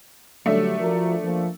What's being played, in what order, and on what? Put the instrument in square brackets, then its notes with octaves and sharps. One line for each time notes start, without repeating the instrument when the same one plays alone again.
[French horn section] D3 F#3 G3 [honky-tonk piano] A3 D4 E5
[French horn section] F3 F#4 A#4
F3 A#3